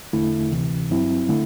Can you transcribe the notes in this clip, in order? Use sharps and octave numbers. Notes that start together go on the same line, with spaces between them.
E2 D3 A3 E4
D2 C3 E3
G2 F#3 C4 E4
D3 A3 E4